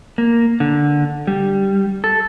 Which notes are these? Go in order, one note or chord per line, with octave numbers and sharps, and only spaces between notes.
A#3
D3
G3
A4